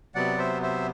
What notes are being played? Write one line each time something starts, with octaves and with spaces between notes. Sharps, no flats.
C3 F#3 B3 D5 F#5
C5 E5
C5 E5